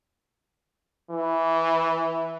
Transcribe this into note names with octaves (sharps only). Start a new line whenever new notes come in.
E3